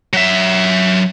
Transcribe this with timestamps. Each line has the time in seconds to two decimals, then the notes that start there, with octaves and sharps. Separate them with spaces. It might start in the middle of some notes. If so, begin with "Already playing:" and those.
0.13 F#3 E5